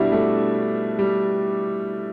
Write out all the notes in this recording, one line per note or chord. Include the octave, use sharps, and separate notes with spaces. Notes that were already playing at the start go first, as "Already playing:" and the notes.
Already playing: B2 G3 D4 E4
A3
G3